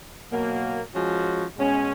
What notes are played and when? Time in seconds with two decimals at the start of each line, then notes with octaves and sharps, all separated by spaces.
0.30 B2 F#3 A#3
0.93 F3 G#3 C#4 F#4
1.56 B2 G#3 C#4